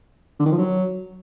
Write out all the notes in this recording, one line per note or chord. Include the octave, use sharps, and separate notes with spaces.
D3
D#3
F3
F#3